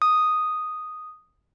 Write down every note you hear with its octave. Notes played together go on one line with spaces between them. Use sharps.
D#6